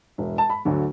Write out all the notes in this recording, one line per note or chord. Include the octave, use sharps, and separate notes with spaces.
E1
A5
B5
D2 D3 F#3 A3